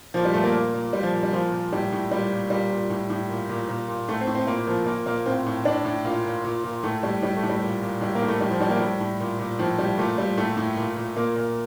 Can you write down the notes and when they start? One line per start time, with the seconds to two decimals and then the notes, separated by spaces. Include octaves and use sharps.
0.14 A#2 F3
0.25 G3
0.34 A#2 A3
0.44 A#3
0.53 A#2
0.74 A#2
0.93 A#2 G3
1.03 F3
1.13 A#2
1.23 G3
1.33 A#2 F3
1.52 A#2
1.72 A2 G3
1.92 A2
2.11 A#2 G3
2.31 A#2
2.50 A#2 G3
2.71 A#2
2.90 A2
3.10 A2
3.29 A#2
3.50 A#2
3.69 A#2
3.88 A#2
4.08 A2 A3
4.21 C4
4.27 A2
4.35 C4
4.47 A#2 A#3
4.67 A#2 F3
4.87 A#2 A#3
5.06 A#2 A#3
5.26 A2 C4
5.46 A2
5.65 A2 D4
5.85 A2
6.05 A#2 F4
6.25 A#2
6.45 A#2
6.64 A#2
6.83 A2 A3
7.03 A2 G3
7.22 A2 G3
7.37 A3
7.43 A2
7.49 G3
7.62 A#2
7.81 A#2
8.01 A2 G3
8.15 A#3
8.22 A2
8.28 A3
8.40 A2 G3
8.51 F3
8.60 A2 G3
8.70 A#3
8.80 A2 G3
9.00 A2
9.20 A#2
9.39 A#2
9.59 A2 F3
9.79 A2 G3
9.98 A#2 A3
10.17 A#2 G3
10.37 A2 A3
10.57 A2
10.77 A#2
10.96 A#2
11.16 A#2 A#3
11.36 A#2